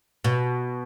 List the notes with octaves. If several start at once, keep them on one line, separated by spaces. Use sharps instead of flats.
B2